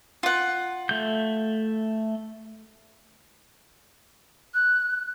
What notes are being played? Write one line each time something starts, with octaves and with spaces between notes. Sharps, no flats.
F4 F#5
A3 G6
F#6